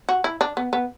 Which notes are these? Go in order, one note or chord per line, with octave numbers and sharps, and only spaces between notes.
F#4
E4
D4
B3
B3